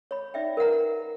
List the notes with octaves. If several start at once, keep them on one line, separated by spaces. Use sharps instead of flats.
C#5 B5
D#4 D5 E5 G5
A#4 B4 F#5 A#5